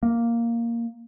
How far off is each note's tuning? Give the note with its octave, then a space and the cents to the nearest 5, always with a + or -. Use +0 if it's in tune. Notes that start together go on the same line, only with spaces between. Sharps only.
A#3 +0